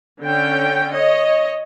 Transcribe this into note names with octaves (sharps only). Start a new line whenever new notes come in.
D3 C#4 G5
C#5 D#5